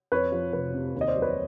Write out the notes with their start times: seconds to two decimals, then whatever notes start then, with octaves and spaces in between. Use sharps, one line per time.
0.12 F2 B4 C#5
0.32 F3
0.53 F1 B4
0.74 C3
0.95 D#2
1.01 D#5
1.08 C5 D5
1.16 F#3
1.22 B4 C#5